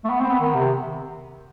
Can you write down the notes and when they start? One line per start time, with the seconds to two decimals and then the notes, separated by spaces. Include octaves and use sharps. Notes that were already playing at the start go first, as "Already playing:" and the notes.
0.05 A3
0.10 B3
0.20 C4
0.30 B3
0.41 D#3
0.55 C3